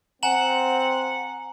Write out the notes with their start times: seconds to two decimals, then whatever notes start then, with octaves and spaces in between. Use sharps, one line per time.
0.23 C4 F#5 G#5 A#5 F#7